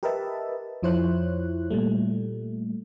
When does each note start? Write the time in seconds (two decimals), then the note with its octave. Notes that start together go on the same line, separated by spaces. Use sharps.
0.03 G4 A#4 B4 D#5 E5 A5
0.83 F2 F3 E4 C5 C#5 F#6
1.70 A#2 G3 A3